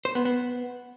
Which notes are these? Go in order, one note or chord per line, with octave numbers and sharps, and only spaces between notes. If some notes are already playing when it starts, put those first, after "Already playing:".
C5
B3
B3